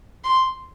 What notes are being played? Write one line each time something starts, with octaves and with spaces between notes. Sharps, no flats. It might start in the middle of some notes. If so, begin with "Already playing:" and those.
C6